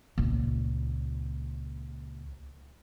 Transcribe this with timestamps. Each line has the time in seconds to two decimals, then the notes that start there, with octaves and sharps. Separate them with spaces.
0.18 C#2 A#2